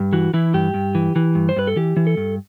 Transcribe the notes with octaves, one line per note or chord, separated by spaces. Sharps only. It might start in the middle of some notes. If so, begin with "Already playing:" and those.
Already playing: G2
E3 F#4
E3 E4
G2 G4
G2
E3
E3
G2
C5
G2 B4
A4
E3 G4
E3
A4
G2